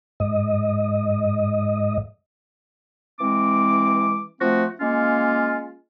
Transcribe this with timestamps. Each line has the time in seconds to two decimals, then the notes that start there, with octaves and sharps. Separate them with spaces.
0.20 G#2 D#5
3.20 E3 G#3 C4 D6
4.41 F3 A3 C4 F#4
4.81 G#3 A#3 C#4 F4